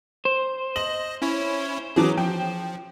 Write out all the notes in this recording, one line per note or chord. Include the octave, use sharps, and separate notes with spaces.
C5
D#5 F#7
C#4 E4 C#5
E3 F#3 C#4 G#4 D6
F3 G5